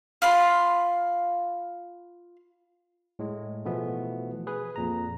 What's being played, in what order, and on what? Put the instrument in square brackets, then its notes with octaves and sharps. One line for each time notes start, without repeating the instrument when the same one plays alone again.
[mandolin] F4 B5 C6
[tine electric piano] A2 G#3
B2 E3 F3 A3 B3
G#4 B4
F2 A#2 A#5